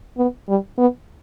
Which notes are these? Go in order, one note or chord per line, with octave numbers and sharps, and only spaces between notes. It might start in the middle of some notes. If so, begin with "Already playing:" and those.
B3
G3
B3